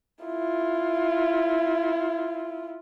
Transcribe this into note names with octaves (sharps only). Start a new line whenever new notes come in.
E4 F4